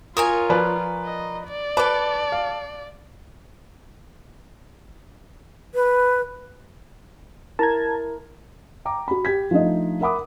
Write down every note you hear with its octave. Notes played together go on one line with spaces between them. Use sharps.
F4 A#4 C#5 G#5 D#6
F3 B4 D5
D#5
D5
A4 B4 D6
F5
B4
E4 A#4 A5 A#5 G#6
G5 A#5 D6
F#4 B5
G4 G#6 B6
F3 A3 D4 D#4 D#5
A#4 E5 F#5 B5 D6 D#6